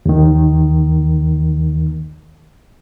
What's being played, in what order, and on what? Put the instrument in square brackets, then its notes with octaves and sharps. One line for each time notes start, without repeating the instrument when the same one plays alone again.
[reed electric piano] D#2 D#3